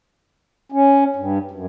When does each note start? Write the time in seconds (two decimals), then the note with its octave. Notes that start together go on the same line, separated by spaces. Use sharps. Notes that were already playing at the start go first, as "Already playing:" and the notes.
0.72 C#4
1.16 G2
1.51 F#2